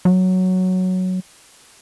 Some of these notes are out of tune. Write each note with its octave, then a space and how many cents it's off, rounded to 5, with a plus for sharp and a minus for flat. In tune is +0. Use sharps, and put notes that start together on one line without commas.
F#3 +0